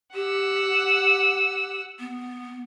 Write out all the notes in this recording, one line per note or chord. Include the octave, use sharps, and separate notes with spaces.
G4 F#5 E6
B3